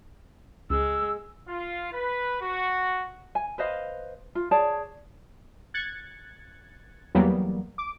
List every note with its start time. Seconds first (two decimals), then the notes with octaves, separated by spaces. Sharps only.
0.70 C#2 G#3 E6
1.48 F4
1.93 B4
2.41 F#4
3.35 G#5
3.58 B4 C5 D#5 F5
4.35 F4
4.51 G#4 C#5 D5 A5
5.74 F#6 G#6 A6 C#7
7.15 E2 F#3 G3 A#3 B3
7.78 D6